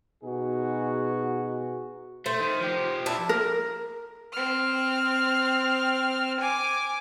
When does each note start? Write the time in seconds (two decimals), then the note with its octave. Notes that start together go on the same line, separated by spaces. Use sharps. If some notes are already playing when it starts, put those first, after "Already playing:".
0.23 B2 D#4 F#4 G#4
2.26 A3 C5
2.39 D#3
2.61 F3 G4
3.06 D4 E4
3.29 A#4
4.32 C4 F6
6.40 G#5 D6